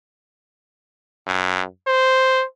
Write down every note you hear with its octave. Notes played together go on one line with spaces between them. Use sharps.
F#2
C5